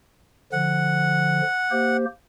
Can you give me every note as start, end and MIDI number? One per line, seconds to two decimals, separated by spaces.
0.52 1.41 50
0.52 1.41 53
0.52 1.97 78
1.71 2.05 58
1.71 2.05 67
1.71 2.05 72